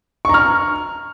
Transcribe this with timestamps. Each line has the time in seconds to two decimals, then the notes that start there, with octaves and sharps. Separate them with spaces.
0.25 C#6
0.29 A#5
0.34 F6